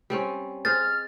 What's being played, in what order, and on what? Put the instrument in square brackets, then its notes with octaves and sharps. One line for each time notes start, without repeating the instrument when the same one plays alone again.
[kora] G3 C4 C#4
[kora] G#4 C5 D#5 [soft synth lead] F6 [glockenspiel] A6